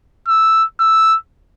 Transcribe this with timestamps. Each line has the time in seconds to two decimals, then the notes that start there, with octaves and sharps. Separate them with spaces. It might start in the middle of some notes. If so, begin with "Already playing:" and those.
0.28 E6
0.80 E6